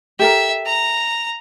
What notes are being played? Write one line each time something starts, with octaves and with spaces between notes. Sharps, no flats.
G4 A4 A#4 E5
A#5